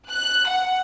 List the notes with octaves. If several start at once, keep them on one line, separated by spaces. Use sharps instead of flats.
F#6
F#5